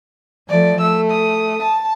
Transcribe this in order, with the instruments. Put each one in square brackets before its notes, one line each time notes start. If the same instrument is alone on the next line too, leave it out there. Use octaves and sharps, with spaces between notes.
[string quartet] F3 A3 [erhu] D5
[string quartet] A3 [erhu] E6
[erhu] D#6
[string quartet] A5